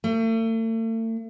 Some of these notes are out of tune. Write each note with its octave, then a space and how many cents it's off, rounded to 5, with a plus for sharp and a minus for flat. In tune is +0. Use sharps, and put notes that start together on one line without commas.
A3 +40